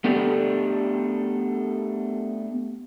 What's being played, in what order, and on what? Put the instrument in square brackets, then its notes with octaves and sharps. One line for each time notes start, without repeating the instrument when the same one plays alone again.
[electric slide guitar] A3 B3 D4 G4 A4